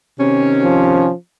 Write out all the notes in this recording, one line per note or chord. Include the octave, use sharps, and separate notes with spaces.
C3 D#3 C#4
F3